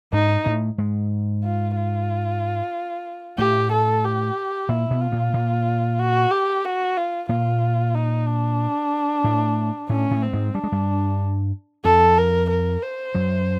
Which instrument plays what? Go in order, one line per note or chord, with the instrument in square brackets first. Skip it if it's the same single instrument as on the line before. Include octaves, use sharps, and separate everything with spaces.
[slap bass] G#2 G#3 [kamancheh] D#4
[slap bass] A2 A3
G#2 G#3
[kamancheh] F4
F4
[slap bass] A2 A3 [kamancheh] G4
[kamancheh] A4
G4
[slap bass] A#2 A#3 [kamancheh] E4
[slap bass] B2 B3
[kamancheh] F4
[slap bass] A#2 A#3
A#2 A#3
[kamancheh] F#4
G4
F#4
F4
[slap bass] A#2 A#3 [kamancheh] F4
[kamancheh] D#4
D4
[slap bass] A2 A3
[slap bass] A2 A3 [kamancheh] C#4
[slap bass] A2 A3
[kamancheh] C4
[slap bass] G#2 G#3
[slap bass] G3 [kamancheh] D4
[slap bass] G#3
G2 G3
[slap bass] F2 F3 [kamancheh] A4
[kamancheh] A#4
A#4
C5
[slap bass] F#2 F#3